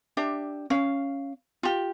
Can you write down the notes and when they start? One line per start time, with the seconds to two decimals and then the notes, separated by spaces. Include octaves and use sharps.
0.17 D4 G4 E5
0.70 C#4 F5
1.63 F4 G4